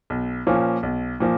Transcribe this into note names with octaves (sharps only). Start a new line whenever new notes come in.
B1
A#2 F3 A#3 C#4
B1
A#2 F3 A#3